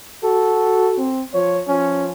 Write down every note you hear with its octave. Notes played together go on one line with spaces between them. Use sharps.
F#4 A4
C4
F3 C#5
F3 C#4